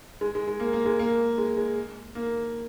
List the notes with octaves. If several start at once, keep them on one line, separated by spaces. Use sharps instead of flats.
G#3
G#3
G#3
A#3
A#3
G#3
A#3
G#3
G#3
A#3